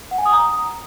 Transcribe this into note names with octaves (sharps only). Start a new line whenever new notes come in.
F#5
G#5
D#6
A#5